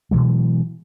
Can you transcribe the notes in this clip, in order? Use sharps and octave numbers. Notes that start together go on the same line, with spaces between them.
B2 E3 F#3 G#3